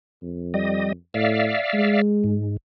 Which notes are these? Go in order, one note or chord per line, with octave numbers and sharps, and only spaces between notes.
F2
G3 D#5
A2 D5 E5 F5
G#3
G#2